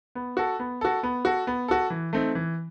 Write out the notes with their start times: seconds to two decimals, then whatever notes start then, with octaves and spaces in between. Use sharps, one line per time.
0.15 B3
0.37 F#4 A4
0.60 B3
0.81 F#4 A4
1.03 B3
1.25 F#4 A4
1.47 B3
1.68 F#4 A4
1.90 E3
2.13 A3 C4 D#4
2.35 E3